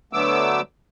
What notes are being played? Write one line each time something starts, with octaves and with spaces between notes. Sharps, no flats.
D3 F#3 A3 B3 D6 E6